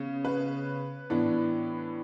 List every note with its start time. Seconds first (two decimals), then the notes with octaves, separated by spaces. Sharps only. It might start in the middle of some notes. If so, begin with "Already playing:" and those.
Already playing: C#3 B3
0.25 B4
1.10 A2 E3 B3 D4